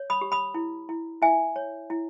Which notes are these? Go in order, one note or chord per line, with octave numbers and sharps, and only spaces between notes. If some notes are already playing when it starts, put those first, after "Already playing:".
Already playing: C#5
B5 D#6
G4
B5 D#6
E4
E4
E4 E5 G#5
C#5
E4